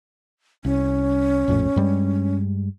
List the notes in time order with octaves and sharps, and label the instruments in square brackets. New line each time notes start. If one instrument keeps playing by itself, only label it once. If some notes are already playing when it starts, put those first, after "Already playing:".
[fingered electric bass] C2 [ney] C#4
[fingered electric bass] A#1 F2 A2
G2 G3 G#3